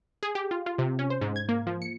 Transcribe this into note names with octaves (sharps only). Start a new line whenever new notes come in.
G#4
G4
F4
F4
C3
C#4
C5
G#2
G#6
A#3
F3
C#7